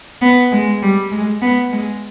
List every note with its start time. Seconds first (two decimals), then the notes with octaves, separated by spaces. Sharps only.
0.22 B3
0.52 G#3
0.82 G3
1.11 G#3
1.41 B3
1.72 G#3